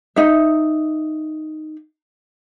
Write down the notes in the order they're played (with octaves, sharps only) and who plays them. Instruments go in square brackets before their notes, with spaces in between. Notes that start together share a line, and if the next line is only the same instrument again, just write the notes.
[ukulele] D#4 E5